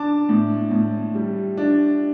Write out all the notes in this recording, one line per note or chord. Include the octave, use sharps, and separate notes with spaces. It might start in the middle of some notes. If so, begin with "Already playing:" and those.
Already playing: D4 A5 D6
A2
A2
G3
D4